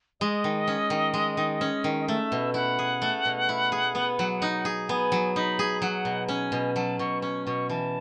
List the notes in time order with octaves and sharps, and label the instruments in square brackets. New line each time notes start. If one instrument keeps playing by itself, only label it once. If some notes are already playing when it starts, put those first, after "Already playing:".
[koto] G#3 [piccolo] D#5
[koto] D#3
C#4
D#3
G#3
D#3
C#4
D#3
[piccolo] D#5
[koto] A3 [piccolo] E5
[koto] B2
[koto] E4 [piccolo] F#5
[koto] G#4
A3
B2
E4
G#4
B3
F#3
D#4
G#4
[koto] B3 [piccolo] G#5
[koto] F#3
[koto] D#4 [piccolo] B5
[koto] G#4
[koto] F#3 [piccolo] F#5
[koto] B2
[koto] C#4 [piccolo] G#5
[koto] B2
[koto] F#3 [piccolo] A5
[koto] B2 [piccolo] C#6
[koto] C#4 [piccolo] C#6
[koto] B2 [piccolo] C#6
[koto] E3 [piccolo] A5